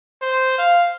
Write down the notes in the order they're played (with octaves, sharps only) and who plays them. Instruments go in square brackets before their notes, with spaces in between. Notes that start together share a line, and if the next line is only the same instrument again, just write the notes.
[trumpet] C5
F5